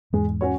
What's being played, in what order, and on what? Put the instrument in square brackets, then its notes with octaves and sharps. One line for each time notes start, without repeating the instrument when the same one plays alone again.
[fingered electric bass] E2 G#2 [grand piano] G#3
[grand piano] C#4 F#4 C#5